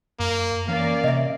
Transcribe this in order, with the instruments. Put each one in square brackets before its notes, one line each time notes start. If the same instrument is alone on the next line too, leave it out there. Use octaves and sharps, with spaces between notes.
[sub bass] F#2 [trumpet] A#3
[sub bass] E3 [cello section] A#3 C#4 D5 [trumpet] F5
[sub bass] C3 [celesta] D#5 E5